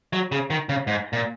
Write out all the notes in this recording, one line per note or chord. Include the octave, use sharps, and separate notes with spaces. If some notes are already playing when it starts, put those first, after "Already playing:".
F#3
C#3
D#3
C#3
G#2
A#2